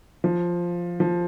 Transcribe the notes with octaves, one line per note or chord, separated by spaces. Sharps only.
F3
F3